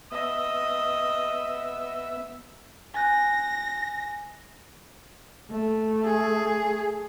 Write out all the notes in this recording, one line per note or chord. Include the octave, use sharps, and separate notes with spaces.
B3 D#5 E5
G#5 F#6 G6 A#6
A3
G#4